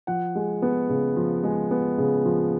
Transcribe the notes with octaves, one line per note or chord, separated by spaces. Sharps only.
F3 F#5
G#3
B3
C#3
F3
G#3
B3
C#3
F3